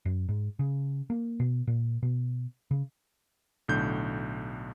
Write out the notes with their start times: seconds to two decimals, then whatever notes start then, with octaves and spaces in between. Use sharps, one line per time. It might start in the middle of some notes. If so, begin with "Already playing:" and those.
0.05 F#2
0.29 G#2
0.59 C#3
1.10 A#3
1.40 B2
1.67 A#2
2.02 B2
2.71 C#3
3.68 B1 A2 D3 G6